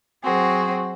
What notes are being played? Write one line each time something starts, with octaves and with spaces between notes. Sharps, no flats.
F#3 C4 F#4 G#4